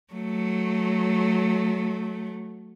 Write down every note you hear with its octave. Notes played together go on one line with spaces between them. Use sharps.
F#3 A3